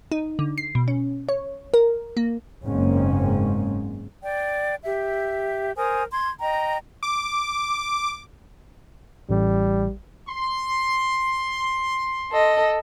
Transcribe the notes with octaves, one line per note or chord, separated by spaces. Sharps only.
D#4
D3
C7
B2
C#4
C#5
A#4
A#3
F#1 G#2 G#3 A#3 C4 C#4
D5 G5
G4 E5
A#4 C5 G#5 D#6
C6 G#6
D#5 G5 A#5
D6
A1 G3
C6
A4 D#5